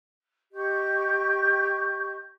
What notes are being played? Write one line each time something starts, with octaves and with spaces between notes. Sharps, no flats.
G4 D#5 C#6 G6